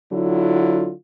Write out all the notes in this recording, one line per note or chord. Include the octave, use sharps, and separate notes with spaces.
D3 F#3 E4 F4